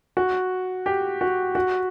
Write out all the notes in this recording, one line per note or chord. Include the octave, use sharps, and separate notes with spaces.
F#4
G4
F#4
F#4